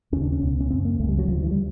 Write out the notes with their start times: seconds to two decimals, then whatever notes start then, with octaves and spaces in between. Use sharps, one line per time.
0.12 D#2 C#4
0.16 C#3
0.22 D4
0.32 C#4
0.42 C#2 B2
0.60 C#4
0.70 C#3 C4
0.74 F#2
0.85 A#3
0.99 C#2 A3
1.03 C#3
1.09 G3
1.19 F#3
1.28 D2 F3
1.32 D3
1.43 E3
1.51 G3